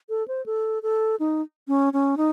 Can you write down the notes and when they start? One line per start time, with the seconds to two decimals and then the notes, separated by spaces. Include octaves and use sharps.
0.09 A4
0.28 C5
0.46 A4
0.83 A4
1.20 D#4
1.68 C#4
1.93 C#4
2.17 D#4